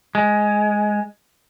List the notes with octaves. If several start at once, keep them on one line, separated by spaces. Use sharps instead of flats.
G#3